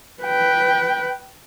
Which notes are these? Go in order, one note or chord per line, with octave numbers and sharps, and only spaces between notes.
B4 G5